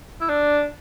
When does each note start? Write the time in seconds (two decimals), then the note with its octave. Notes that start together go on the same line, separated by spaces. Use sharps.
0.21 E4
0.29 D4